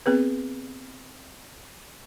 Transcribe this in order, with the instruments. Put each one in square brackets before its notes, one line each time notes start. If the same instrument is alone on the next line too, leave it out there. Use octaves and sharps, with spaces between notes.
[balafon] B3 C4 G#4 B4